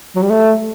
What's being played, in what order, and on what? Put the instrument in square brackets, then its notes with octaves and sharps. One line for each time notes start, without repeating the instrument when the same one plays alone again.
[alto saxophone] F#3
G3
A3